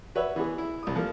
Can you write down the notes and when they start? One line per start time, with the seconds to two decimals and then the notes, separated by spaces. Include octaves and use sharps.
0.15 F#4 B4 C#5 E5
0.36 E3 B3 G#4
0.58 E4
0.83 C2 D#6
0.95 F3 A3 A#3